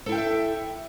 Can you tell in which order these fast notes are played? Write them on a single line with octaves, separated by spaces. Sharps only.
A4 E4 G5 F5 E5